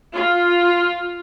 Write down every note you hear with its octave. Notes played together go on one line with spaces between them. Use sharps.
F4